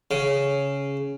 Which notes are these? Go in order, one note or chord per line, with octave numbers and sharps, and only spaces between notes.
C#3